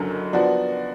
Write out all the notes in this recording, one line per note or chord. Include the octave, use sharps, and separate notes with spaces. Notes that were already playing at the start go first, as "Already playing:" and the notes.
Already playing: F#1 F#2 D3 F#3
F3 B3 D4 F#4